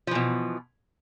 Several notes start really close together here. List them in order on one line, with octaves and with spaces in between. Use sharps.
F3 E3 B2